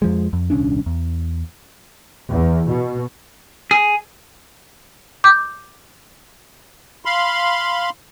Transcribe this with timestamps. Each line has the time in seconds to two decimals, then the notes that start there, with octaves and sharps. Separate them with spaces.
0.02 F2 F3 G#3
0.33 F2
0.50 D#1 C2 C#4 D4
0.86 E2
2.31 E2
2.69 B2
3.71 G#4
5.24 D6 G6
7.05 F5 B5 C6